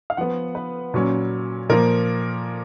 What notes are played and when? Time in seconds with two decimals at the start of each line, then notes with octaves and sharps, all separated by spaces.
0.10 F5
0.17 F3 B3 F#5
0.55 B4
0.94 A#2 F#3 C#4
1.69 A#2 F3 A#3 A#4